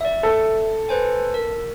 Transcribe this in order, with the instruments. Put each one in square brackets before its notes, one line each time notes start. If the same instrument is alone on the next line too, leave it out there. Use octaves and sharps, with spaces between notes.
[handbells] D5 E5
[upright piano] A4
[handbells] B4 C5 G#5
A#4